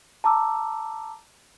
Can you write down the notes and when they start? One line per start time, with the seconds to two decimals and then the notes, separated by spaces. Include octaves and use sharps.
0.24 A5 A#5 D6 E6